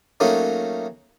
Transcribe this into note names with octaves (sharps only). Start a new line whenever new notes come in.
F#3 A3 A#3 C#4 D#4